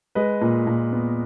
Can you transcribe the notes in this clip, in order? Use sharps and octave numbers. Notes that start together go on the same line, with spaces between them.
G#3 B4 D#5
A#2
A#2
B3